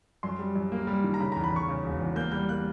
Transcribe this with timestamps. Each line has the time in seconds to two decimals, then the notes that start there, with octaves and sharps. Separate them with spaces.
0.23 F#2 C6
0.39 G3
0.55 F#2
0.72 A#3
0.87 G3
1.04 D#3
1.14 A#5
1.20 C#3 B5
1.32 E2 A#5
1.44 B5
1.53 E2 C#6
1.68 C#3
1.84 E1
2.00 E2
2.16 A#3 G6
2.32 G3 G6
2.49 A#3 F#6